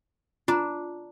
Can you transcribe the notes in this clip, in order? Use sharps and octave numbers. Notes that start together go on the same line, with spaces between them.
D4 F4 A#5